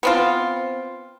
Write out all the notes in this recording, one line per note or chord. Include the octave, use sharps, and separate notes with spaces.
B3 C4 F4